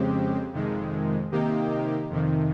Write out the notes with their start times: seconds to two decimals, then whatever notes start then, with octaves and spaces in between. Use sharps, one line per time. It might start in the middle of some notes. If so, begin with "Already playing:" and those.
Already playing: F2 C#3 G#3 C4 G4
0.53 F2 C3 D#3 G#3
1.32 C3 D#3 A#3 D#4 G4
2.10 F2 C3 D#3